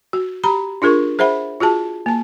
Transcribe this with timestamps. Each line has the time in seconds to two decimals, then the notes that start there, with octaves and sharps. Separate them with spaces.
0.13 F#4
0.44 G4 A#5 B5
0.82 D4 F4 G#4 A#4 C#6
1.19 G#4 C5 E5 F#5 B5
1.60 F4 F#4 G#4 A5
2.06 A#3 A5